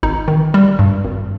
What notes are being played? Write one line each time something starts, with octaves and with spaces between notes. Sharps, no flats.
G#1 D#4
D#3
G3
G2
G#1